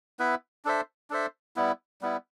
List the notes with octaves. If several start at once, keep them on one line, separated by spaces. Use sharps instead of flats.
B3 E4 B4 E5
D4 A4 C5 E5
D4 A4 C5 E5
G3 B3 E4
G3 B3 E4